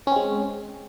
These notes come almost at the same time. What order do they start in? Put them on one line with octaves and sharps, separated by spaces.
C#4 C4 G#3